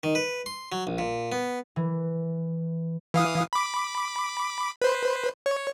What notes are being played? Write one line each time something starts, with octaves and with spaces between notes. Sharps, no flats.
D#3
B4
C6
F#3
A#1
A#2
B3
E3
E3 F5 D#6
B5 D6
B4 C5
C#5